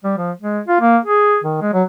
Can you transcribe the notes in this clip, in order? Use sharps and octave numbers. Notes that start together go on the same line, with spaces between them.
G3
F3
G#3
F4
A#3
G#4
D#3
G#3
F#3